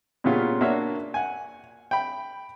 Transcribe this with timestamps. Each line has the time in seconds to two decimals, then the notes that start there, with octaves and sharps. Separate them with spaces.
0.24 A#2 C#3 G3 B3 C#4 F4
0.61 A#3 D4 F#4 C#5 E5
1.14 F#5 G#5
1.91 G5 B5